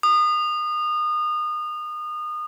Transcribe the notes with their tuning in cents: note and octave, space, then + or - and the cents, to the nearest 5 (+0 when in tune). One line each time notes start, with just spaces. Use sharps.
D#6 -30